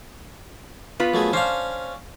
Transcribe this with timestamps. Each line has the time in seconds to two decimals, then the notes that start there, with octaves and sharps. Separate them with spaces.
1.00 B3 F4 B4
1.14 F#2 A3 G#4
1.33 C#4 D4 C5 F5